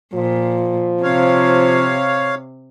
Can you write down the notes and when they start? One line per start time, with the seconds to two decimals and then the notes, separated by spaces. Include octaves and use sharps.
0.14 A#2 F3
1.03 C3 C#5 F5